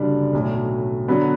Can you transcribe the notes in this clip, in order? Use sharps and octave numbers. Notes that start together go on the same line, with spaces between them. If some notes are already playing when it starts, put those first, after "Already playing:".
Already playing: F#1 F#2 D3 G3 D4
B1 A2 F#3
D3 F#3 B3